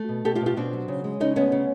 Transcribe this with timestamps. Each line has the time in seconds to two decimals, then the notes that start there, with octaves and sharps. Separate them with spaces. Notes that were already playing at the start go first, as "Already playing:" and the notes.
Already playing: A3
0.09 B2
0.25 B2 G4 A4
0.35 F4 G4
0.41 B2
0.46 F4 G4
0.56 B2 C4 D4
0.73 F#3
0.88 C#3
1.04 G#3
1.20 C#3 C#4 D#4
1.36 D2 B3 C#4
1.52 C#3